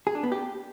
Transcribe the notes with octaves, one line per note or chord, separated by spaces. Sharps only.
G#4
D4
B3
G4